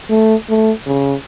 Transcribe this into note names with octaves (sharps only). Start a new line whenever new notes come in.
A3
A3
C#3